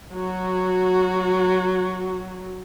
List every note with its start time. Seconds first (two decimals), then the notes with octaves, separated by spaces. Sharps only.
0.14 F#3 F#4